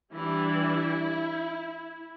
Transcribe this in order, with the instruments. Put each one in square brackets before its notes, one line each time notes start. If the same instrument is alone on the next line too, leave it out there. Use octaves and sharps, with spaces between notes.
[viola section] E3 G3 D4 E4